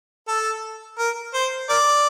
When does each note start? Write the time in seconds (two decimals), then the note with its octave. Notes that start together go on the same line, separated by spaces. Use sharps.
0.28 A4
0.98 A#4
1.34 C5
1.69 A#4 D5